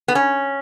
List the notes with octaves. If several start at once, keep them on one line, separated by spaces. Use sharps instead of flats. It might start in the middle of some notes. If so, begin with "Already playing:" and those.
B3
C#4